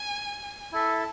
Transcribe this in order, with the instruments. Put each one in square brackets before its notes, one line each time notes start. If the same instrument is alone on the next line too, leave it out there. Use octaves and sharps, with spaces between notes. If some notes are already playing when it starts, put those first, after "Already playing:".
Already playing: [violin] G#5
[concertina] E4 A4 E5 [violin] A5